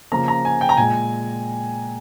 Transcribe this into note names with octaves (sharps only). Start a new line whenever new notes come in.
C#3 F3 A#3 A#5
A#5
G#5
G5
A#5
A#2 G#3 G#5